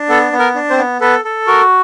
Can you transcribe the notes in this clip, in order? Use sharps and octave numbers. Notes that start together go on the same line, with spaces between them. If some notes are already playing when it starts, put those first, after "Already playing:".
Already playing: D4
B3 A4
B3
A#4
D4
C4 C5
B3
B3 A4 B4
A4
F#4 A#4